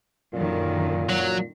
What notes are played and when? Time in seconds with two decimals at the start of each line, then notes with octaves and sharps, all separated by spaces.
0.33 F#2 A#2 D3 D#3
1.09 F#3